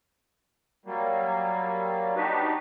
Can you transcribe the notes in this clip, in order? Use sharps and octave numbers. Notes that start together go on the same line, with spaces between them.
F#3 G3 A#3
D4 D#4 F#4 G4 B4